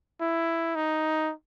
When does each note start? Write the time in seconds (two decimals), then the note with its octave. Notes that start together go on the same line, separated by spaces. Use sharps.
0.21 E4
0.76 D#4